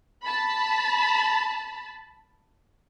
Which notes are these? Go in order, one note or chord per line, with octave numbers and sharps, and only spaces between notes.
A5 B5